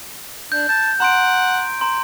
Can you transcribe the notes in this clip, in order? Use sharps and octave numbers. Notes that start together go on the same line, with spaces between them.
D4 G6
A5 G6
F#5 A#5 C6 D7
A#5 C6